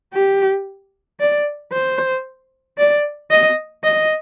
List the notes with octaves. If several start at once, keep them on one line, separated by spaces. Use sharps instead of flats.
G4
D5
C5
D5
D#5
D#5